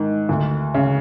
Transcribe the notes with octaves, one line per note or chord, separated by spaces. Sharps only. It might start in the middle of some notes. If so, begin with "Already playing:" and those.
Already playing: G#2 D#3
D2
C#3